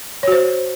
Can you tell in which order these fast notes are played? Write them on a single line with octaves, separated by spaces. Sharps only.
C#5 F#4 C5